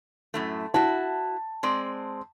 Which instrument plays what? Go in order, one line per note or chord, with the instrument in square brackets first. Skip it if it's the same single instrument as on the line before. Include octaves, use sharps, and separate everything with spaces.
[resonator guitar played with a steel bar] F#2 A2 A3
[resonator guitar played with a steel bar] E4 F#4 [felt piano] A5
[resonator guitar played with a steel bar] G#3 C4 D5